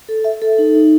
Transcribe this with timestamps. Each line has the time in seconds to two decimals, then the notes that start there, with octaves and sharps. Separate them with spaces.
0.09 A4
0.24 E5
0.42 A4
0.58 D#4
0.75 D#4